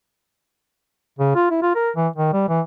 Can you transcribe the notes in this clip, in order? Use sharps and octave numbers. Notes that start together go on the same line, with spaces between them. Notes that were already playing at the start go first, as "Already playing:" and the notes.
C#3
F4
E4
F4
A#4
E3
D#3
G3
E3